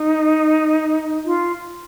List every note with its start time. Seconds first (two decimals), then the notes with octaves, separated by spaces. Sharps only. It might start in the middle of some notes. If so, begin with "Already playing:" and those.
Already playing: D#4
1.25 F4